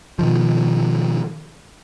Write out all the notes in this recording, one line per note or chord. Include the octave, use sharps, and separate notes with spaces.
B2 D#3 F3